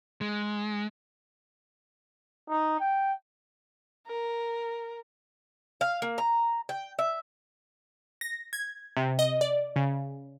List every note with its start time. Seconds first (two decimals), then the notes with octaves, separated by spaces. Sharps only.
0.21 G#3
2.49 D#4
2.80 G5
4.07 A#4
5.81 F5
6.02 A#3
6.18 A#5
6.69 G5
6.99 E5
8.21 A#6
8.53 G#6
8.97 C3
9.19 D#5
9.41 D5
9.76 C#3